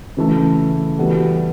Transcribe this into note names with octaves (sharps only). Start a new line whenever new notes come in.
C#3 E3 A3
E3 G3 B3 F#4 A4